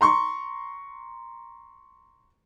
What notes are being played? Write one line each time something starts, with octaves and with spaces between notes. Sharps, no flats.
A#5 C6 C#6